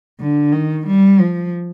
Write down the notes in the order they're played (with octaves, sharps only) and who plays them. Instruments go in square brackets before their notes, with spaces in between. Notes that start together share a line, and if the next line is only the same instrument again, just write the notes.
[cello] D3
D#3
G3
F3